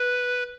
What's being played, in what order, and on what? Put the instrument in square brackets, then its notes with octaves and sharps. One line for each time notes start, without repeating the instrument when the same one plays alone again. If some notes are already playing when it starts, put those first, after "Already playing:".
Already playing: [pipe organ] B4